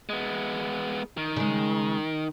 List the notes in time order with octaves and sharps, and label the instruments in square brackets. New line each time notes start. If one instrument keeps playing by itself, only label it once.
[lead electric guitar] G#3 B3
D#3
[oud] C#3 G#3